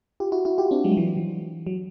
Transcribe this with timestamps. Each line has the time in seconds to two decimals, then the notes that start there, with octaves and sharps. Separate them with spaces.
0.20 F4 G4
0.32 E4 F#4
0.45 E4 F#4
0.58 F4 G4
0.71 C4 D4
0.84 F#3 G#3
0.92 G3
0.97 E3 F#3
1.17 E3
1.67 F#3